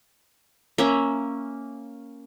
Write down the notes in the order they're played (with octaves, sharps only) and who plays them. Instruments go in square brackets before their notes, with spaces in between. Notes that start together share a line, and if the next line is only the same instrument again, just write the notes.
[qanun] A#3 C#4 E5